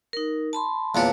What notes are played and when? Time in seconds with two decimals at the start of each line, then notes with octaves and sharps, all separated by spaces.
0.13 D#4 A#4
0.53 A5 B5 C6
0.95 E2 A#2 D4 B4 C#5 A5